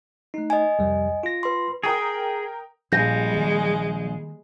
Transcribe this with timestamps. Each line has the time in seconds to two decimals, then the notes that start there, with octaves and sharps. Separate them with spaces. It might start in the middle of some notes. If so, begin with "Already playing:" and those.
0.34 A3 D#4
0.50 D#5 G#5
0.79 C2 F2 G3
1.23 F4 A#6
1.43 B4 C6
1.84 G#4 A#4 G5 D#6
2.92 A#1 A#2 G3 G#3 G6 A#6
3.33 D#3 A#3